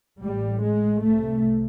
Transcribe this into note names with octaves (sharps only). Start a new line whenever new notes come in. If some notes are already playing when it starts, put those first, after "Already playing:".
A1 A2 G3
G#3
C2 C3 A3